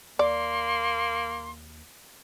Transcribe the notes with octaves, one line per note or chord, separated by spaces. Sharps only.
D#2 A#3 D5 C6